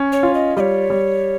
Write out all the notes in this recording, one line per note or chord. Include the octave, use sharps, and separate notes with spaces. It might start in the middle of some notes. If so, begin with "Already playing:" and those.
Already playing: C#4
C#5
F4
D#5
G3 C#5 D#5
G3